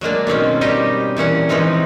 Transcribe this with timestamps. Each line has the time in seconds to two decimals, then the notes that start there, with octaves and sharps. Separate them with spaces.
0.01 F#3 G#3 A#3 D4
0.27 B2 D#3 C4 C#4
0.61 G3 D#4 G4 D#5
1.17 A#2 E3 C#4 F#5
1.49 E3 F3 G#3 C4 D#4